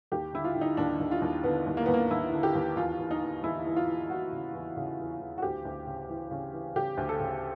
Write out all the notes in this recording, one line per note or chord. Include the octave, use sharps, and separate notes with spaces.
D#2 G4
D3 E4
F4
D3
D#4
D#2 D4
D#2
F4
D#2
D3 B3
D#2
A#3
D#2 B3
A#3
D#2 E4
D3
G4
D#2
E2 F4
E2
D#4
E3
E2 E4
E2
F4
E3
E2 F#4
C#3
E2
C#3
E2
E3
F#4
D2 G4
D2
C#3
E3
C#3
E3
C#3 G4
D2
A4
C#3